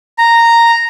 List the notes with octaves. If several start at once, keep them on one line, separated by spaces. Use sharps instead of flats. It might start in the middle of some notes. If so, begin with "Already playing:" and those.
A#5